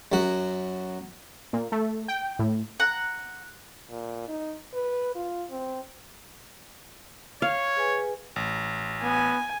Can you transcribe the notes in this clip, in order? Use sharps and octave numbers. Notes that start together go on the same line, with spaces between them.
F#2 F#4
A#2
A3
G5
A2
F#5 A#5
A#2
D#4
B4
F4
C4
C#5 F5
G#4 B4 G#5
A1
B3 G#5